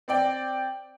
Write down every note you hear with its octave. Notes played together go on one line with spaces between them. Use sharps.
C4 D5 G5